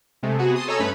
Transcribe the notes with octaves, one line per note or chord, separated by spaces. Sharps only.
C3 G#3 A3
C3 B3 F#4 G#4
A5 C6 D#6
A4 C#5 D#5 G#5 A#5 E6
G2 A3 C#4 B4 B5